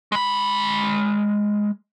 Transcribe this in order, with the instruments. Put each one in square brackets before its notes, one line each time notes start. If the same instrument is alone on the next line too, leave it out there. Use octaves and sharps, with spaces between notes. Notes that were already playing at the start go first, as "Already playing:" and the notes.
[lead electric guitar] G#3 B5